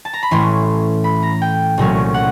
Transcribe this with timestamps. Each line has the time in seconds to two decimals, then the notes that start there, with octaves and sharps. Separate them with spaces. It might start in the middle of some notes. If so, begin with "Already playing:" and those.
0.05 A5
0.13 A#5
0.23 B5
0.31 A2 E3 A3 C#4 C6
1.04 B5
1.23 A#5
1.42 G5
1.77 C2 A#2 F#3 A3 C#4
2.14 F#5